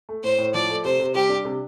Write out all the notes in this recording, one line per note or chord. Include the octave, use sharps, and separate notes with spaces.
A3
A2 C5
A2
F3 D5
A3
C3 C5
C3
G3 G4
D4
C3